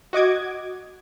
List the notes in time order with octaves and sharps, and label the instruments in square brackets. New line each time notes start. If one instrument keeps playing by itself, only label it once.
[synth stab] F#4 D#5 D6 G#6